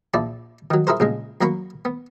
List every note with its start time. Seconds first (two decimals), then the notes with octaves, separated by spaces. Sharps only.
0.14 A#1 E4 D5 A5
0.71 D#3 F#3
0.87 E4 G#4 A#4 C5
1.00 A#1 C#3 G#3
1.41 F#2 F#3 A#3 B5 C#6
1.85 B3